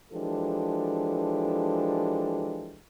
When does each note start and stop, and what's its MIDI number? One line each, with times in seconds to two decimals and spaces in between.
0.12 2.79 52
0.12 2.79 53
0.12 2.79 56
0.12 2.79 62
0.12 2.79 67
0.12 2.79 69